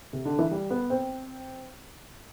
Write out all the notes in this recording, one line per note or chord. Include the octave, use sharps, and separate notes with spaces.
C3
D3
E3
G3
B3
C4